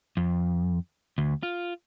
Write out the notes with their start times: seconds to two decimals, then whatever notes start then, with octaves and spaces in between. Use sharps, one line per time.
0.17 F2
1.18 D2
1.43 F4